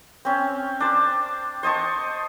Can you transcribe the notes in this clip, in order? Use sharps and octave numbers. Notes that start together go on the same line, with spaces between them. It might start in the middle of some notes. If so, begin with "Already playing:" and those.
C4 C#4
D4 C5
C5 D#5 A5 C#6